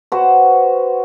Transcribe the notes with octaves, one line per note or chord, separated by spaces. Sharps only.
F#4 B4 C5